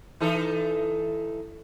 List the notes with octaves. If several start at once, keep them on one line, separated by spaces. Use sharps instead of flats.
E3 D#4 A4